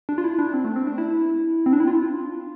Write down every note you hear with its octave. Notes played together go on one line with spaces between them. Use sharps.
D4
F4
E4
D4
C4
A3
C4
D4
E4
C4
D4
E4
F4